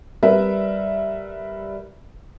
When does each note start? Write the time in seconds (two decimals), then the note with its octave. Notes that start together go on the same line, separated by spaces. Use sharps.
0.23 G3 A#4 B4 E5